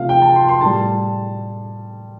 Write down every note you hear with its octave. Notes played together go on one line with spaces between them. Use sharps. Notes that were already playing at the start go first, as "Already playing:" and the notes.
Already playing: C3 F3 A3 F5
G5
A5
C6
C6
A2 G3 A5